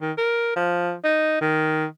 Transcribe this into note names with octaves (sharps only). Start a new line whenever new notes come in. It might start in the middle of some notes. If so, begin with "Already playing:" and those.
D#3
A#4
F3
D#4
D#3